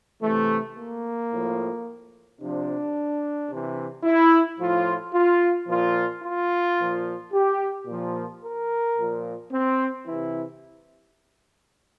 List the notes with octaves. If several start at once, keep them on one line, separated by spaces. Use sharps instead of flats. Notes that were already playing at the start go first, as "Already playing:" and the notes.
C3 E3 A3
A#3
A2 F3
C3 F3 D4
C3 E3
E4
A2 F3 F4
F4
A#2 F3 F4
F4
A#2 F3
G4
A#2 F3
A#4
A#2 F3
C4
C3 E3 E4